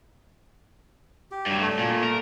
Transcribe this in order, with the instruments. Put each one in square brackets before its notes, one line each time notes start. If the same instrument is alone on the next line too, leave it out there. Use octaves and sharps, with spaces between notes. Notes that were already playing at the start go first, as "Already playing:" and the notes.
[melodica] G4
[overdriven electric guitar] G2 F#3
[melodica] A3
[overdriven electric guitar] A#2
A#4